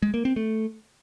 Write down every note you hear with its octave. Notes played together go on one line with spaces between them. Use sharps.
G#3
A#3
C4
A3